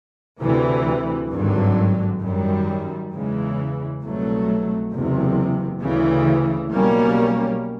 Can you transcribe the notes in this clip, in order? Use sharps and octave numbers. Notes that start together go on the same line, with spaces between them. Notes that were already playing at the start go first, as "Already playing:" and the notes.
D2 C3 E3
G#1 G2 D3 F#3
F#2 D#3 G3
E2 C#3 E3 G#3
C2 B2 F#3 A3
F#1 E2 C3
D2 C#3 E3
B1 B2 G3 A#3 C#4